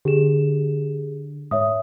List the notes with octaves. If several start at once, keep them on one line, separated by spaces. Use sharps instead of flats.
D3 G4 G#4 E7
G#2 C#5 E5 D#6